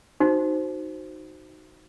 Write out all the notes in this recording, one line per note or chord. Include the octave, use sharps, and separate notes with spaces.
D#4 F#4 C5